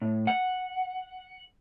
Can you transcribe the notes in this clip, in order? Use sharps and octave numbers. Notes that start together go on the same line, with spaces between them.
A2
F#5